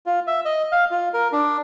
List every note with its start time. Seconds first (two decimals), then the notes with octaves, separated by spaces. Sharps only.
0.06 F4
0.27 E5
0.45 D#5
0.72 F5
0.91 F4
1.14 A#4
1.32 D4